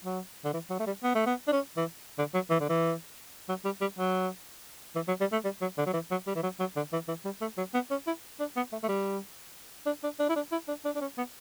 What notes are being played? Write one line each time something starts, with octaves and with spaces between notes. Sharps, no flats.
F#3
D3
E3
F#3
A3
G3
B3
A3
B3
D4
C#4
E3
D3
F#3
E3
D3
E3
F#3
G3
G3
F#3
E3
F#3
G3
A3
G3
F#3
D3
F#3
E3
F#3
G3
E3
F#3
F#3
D3
E3
E3
G3
A3
F#3
B3
C#4
E4
D4
B3
A3
A3
G3
D4
D4
D4
E4
D4
E4
D4
D4
D4
C#4
B3